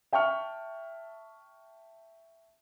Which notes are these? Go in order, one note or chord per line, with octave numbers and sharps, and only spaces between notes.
E5 G5 A5 C#6 F6